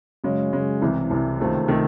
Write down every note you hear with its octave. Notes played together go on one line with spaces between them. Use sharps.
F#2 C#3 G#3 C#4
F#2 C#3 G#3 C#4
C2 C3 E3
C2 C3 E3
C#2 C3 D#3 A3 C4
C3 D#3 A3 C4